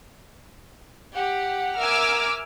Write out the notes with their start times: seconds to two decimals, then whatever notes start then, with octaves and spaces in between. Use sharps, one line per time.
1.15 G4 F#5
1.78 A#4 E5 G#5 D6 E6 F6